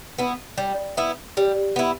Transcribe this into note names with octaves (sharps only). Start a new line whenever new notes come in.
B3 E4
G3
B3 E4
G3
B3 E4